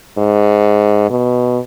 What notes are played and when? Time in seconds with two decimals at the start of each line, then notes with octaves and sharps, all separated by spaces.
0.18 G#2
1.10 B2